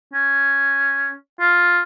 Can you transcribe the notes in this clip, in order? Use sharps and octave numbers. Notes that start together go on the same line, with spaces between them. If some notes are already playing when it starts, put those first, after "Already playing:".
C#4
F4